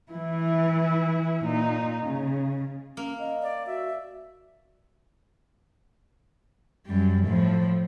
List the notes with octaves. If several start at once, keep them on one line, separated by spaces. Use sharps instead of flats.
E3 E4
A#2 D#4
C#3
A#3 C#4
D#5
D5
F#4 E5
F#2 G3
A2 F3